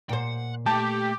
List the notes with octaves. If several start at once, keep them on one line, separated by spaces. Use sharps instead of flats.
A#2 C5 F#5 G5
A3 G4 A4 A5